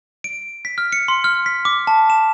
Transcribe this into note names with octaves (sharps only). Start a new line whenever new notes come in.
D7
B6
F6
C#7
C6
F6
B6
D6
A5
E7